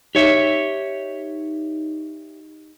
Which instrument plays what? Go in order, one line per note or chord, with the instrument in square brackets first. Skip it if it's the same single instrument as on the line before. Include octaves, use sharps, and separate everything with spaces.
[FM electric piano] D#4 [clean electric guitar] G4 C#5 E5